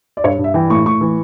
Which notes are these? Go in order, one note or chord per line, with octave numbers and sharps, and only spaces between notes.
D5
G2 C#5
G2
E5
E3 G5
A2 C#6
A2 C#6
E3